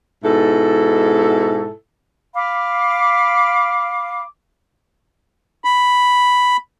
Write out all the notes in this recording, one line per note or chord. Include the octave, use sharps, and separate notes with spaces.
G#2 B2 E4 A4
F5 B5 D6
B5